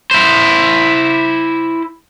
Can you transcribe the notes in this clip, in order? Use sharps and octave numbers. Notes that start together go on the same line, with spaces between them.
E4 C5